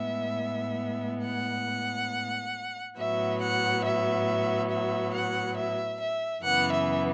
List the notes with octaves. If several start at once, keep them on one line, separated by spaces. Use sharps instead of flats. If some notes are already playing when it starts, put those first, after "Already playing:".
Already playing: A2 G#3 B3 E5
F#5
A2 F#3 B3 E5
F#5
E5
E5
F#5
E5
E5
F#2 C#3 E3 B3 F#5
E5